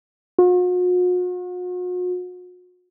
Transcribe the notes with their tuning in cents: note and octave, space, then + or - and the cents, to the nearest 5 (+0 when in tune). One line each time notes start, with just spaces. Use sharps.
F#4 -45